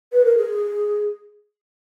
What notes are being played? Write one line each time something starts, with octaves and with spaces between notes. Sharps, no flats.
B4
A#4
G#4